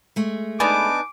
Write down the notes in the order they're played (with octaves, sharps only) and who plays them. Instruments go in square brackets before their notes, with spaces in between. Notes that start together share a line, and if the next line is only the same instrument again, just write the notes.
[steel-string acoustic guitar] G#3 A3
[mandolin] B3 D4 D#4 [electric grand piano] G#5 [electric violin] D6